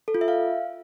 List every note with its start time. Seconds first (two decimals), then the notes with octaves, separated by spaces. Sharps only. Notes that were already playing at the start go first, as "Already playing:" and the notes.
0.08 A4
0.15 F4
0.21 E5
0.28 F5